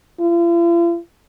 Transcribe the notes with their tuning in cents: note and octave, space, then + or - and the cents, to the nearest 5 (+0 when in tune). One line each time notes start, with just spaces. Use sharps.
F4 -45